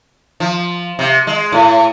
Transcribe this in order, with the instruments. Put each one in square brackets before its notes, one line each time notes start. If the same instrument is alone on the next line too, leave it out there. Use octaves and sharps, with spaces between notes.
[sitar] F3
C3
G#3
A2